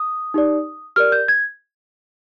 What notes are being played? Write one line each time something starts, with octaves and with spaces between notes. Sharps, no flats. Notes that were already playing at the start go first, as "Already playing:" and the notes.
Already playing: D#6
D#4 G4 D5
G4 A#4 D5 F6
G6
G#6